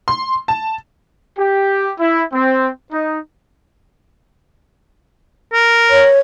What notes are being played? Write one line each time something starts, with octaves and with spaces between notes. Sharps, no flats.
C6
A5
G4
E4
C4
D#4
A#4
C#5